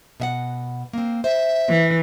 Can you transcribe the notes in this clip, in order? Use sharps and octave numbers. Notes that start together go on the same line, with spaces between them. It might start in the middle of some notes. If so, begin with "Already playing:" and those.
B2 E5 F#5
A#3 C4
C5 E5
E3